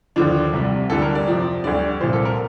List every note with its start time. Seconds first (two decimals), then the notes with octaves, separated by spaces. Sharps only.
0.16 D#2 D3 F3 D4
0.53 C2 C3 G3
0.90 D2 D3 G3 A4
1.02 A#4
1.15 D5
1.28 F2 C3 F3
1.64 D2 D3 G3 D5
2.01 C2 A#2 F3 C5
2.13 A4
2.25 A#4